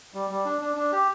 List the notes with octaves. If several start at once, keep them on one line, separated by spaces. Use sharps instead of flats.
G3
G3
D4
D4
D4
G4